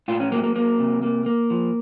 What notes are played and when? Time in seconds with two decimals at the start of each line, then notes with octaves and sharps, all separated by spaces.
0.08 A2 F4
0.20 C#4
0.31 F#3 A#3
0.44 A#3
0.55 F#3 A#3
0.79 C3
1.03 A#3
1.26 A#3
1.50 F3